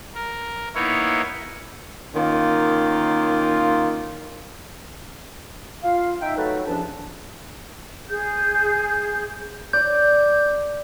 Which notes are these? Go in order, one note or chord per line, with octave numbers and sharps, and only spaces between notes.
A#4
A#3 B3 D#4 E4 C#5
D#3 A#3 C#4 D#4 F4
F4 F5
D#4 E5 G5
F#3 A3 D#4 A4 B4
E2 G2 F3 C#4 D4 A5
G#4 G6
D5 G6